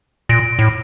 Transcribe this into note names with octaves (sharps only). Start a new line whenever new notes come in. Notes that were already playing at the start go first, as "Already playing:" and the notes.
A#2 A#6 D7
A2